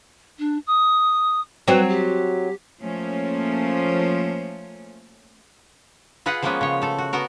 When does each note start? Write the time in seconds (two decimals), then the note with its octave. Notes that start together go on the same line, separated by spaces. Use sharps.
0.39 D4
0.67 D#6
1.68 F#3 C4 B4
1.88 G4
2.81 F3 A3 A#3 C#4
6.26 F4 G#4 B4 D#5 F#5
6.42 F3 G#3 A#3 B3 C#4 B4
6.61 C#3 C#5
6.82 A3 A4
6.98 F#4
7.13 B3 F#4 A#4